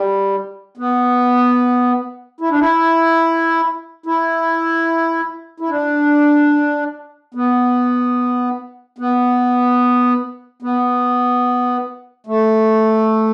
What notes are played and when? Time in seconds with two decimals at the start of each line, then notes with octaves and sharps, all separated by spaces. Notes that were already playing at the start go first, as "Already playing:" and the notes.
Already playing: G3
0.77 B3
2.40 E4
2.50 D4
2.59 E4
4.06 E4
5.60 E4
5.69 D4
7.34 B3
8.98 B3
10.62 B3
12.27 A3